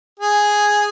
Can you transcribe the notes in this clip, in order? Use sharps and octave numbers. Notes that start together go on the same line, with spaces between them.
G#4